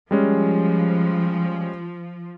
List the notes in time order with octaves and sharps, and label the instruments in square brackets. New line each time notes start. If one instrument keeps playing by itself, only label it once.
[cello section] F3 [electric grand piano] G3 G#3 C#4